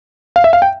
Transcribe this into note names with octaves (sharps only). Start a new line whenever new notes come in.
F5
E5
F5
G5